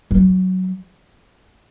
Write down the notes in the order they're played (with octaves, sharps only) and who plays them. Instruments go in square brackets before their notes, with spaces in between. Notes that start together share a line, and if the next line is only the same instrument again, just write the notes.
[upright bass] F#3